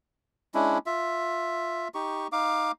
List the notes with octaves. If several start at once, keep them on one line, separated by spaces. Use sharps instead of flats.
G#3 C#4 D4 E4
F4 E5
D#4 G4 C#6
D#4 F5 D6